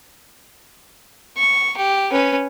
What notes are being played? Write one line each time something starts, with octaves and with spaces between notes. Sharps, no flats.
C#6
G4
C#4 B4